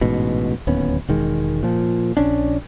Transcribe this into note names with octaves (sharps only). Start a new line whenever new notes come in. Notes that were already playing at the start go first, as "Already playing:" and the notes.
A1 G#2 B2
D1 D#2 B3 C#4
E1 D#3 G#3
A#2 F3
A#1 C#4 D4